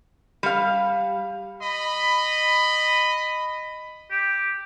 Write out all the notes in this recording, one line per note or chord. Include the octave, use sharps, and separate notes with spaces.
G3 F5
D#5 B5
G4